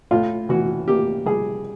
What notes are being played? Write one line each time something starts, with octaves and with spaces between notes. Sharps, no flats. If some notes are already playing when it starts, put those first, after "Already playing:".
A2 F4
E3 F#4
A#3 G4
G3 G#4